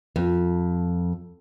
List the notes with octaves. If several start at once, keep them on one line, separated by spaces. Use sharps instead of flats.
F2